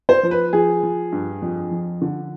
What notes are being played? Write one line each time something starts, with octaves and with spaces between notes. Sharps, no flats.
C5
F3
B4
F3 G#4
F3
G2
F2
F3
D3